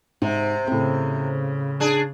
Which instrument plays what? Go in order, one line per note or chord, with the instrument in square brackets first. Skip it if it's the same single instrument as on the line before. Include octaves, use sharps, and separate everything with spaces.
[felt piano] G#2 [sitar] C3
[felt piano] A2 C4 [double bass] C#3
[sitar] D4 G#4